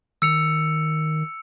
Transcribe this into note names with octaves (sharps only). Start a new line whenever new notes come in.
D#3 E6 C#7 F7